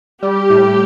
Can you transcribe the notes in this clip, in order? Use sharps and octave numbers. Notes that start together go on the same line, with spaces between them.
G3 G4
A2